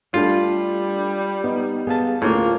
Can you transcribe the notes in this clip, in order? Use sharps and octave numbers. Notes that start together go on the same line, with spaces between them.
G3 A3 D4 F4 A4
B3 D#4
B3 G#4 F5 A5
D2 A2 A#3 C#4 F4